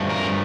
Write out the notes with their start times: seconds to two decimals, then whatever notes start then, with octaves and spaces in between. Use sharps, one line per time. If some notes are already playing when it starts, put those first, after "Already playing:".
Already playing: G2 F3 A3
0.10 A#4